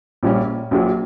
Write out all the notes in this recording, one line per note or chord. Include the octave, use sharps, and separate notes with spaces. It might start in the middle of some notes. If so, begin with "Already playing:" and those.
A#1 A#2 G3 C#4
A#1 A#2 F#3